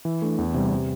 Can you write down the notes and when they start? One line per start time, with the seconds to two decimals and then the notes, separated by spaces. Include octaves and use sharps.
0.05 E3
0.22 A3 D4
0.38 E2
0.54 C3 G3
0.71 C3